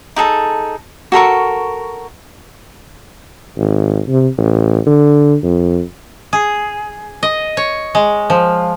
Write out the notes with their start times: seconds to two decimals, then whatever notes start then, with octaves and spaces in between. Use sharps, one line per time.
0.16 D#4 G#4 A4 A5
1.12 F#4 A4 A#4 C#6
3.58 G#1
4.08 C3
4.38 A1
4.87 D3
5.43 F2
6.33 G#4
7.23 D#5
7.57 C#5
7.95 G#3
8.30 F3